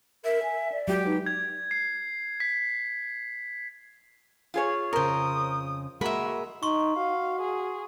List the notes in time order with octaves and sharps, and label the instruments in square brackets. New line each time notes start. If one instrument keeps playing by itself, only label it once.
[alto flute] A#4 [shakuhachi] E5
[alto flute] G#5
D5
[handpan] F#3 G#3 F#4 [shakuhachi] G4
[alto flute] D#4 [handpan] B4
[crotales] G#6
C7
B6
[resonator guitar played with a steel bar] F4 G#4 C#5
[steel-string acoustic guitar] F2 C#3 [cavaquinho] A#4 C5 [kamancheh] D#6
[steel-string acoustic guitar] G#3 A#3 A#4 [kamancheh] F#4 [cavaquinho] E5 B5
[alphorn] D#4 [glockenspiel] C6 C#6
[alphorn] F#4 [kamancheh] F5
[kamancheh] G#4